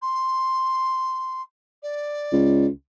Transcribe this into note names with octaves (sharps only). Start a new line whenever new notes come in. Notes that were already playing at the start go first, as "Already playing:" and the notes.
C6
D5
C#2